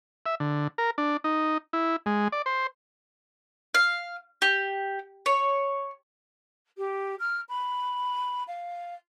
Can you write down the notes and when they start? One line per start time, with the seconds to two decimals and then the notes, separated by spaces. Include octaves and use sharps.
0.26 E5
0.40 D3
0.78 A#4
0.98 D4
1.24 D#4
1.73 E4
2.06 G#3
2.32 D5
2.46 C5
3.75 F5
4.42 G4
5.26 C#5
6.77 G4
7.19 F6
7.49 B5
8.47 F5